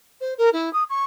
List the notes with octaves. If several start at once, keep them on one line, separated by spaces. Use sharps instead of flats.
C5
A#4
E4
D#6
C#6